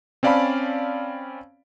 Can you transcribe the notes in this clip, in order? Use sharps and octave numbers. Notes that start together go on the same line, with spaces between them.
C4 C#4 D5 F5 A5 B5